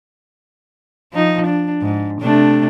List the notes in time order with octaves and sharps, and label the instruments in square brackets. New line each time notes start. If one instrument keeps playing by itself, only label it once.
[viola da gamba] F3 D#4
D4
G#2
C3 A3 D4